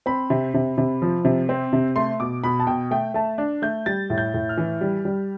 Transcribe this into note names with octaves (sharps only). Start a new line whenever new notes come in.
C4 B5
C3
C3
C3
F3
C3
C4
C3
A3 C6
B2 D6
B2 B5
A5
B2 G5
A3 G5
A3 A5
D4
A3 G6
G3 A6
A2
G6
A2
F6
E3
G3
G3